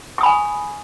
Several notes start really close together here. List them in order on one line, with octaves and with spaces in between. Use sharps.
C#6 D#6 B5 G#5